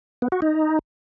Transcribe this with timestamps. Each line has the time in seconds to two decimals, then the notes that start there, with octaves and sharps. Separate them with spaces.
0.22 B3
0.32 F#4
0.42 D#4